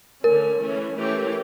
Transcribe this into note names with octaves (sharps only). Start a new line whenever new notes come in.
D3 A3 C#4 A#4
E3 A3 C#4
E3 A3 C#4 G4